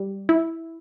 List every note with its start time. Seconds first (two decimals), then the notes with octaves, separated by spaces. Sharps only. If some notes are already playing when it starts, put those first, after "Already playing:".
Already playing: G3
0.29 E4